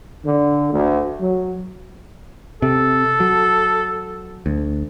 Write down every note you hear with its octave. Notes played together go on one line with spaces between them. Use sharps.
D3
D2
F#3
C3 A4
F#3
D2